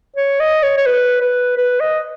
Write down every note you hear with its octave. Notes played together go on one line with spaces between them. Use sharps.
C#5
D#5
C#5
C#5
B4
B4
B4
D#5